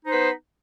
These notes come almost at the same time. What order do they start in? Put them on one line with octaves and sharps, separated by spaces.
D#4 C5 B3 B4